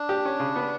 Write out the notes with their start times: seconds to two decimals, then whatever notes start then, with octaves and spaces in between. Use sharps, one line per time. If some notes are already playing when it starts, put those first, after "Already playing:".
Already playing: D4
0.09 G4
0.25 C#4
0.40 C#3
0.56 B3